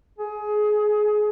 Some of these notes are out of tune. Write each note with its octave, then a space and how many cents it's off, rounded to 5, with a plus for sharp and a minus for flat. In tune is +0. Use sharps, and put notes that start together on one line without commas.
G#4 +25